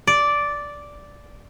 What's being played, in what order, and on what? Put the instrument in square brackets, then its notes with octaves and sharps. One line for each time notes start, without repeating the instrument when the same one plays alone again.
[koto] D5